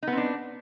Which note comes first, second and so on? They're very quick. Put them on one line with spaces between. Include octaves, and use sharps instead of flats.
D#4 B3 C4 D4